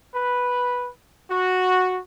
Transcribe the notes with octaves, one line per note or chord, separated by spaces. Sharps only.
B4
F#4